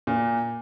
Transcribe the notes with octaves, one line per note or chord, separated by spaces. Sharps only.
A#2